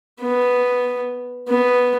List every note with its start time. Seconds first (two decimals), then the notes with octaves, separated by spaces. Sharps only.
0.21 B3
1.49 B3